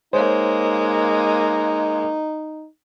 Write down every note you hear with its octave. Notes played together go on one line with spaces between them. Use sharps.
G#3 A#3 D#4 C5 C#5